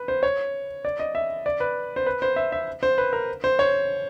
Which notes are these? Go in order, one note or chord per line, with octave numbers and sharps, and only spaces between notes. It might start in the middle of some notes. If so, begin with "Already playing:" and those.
Already playing: B4
C5
C#5
D5
D#5
E5
D5
B4
C5
B4
C5
E5
E5
C5
B4
A#4
C5
C#5